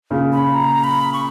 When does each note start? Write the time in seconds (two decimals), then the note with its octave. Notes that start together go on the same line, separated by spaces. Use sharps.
0.10 A#2 C#3
0.33 B5
0.54 A#5
0.84 B5
1.13 C#6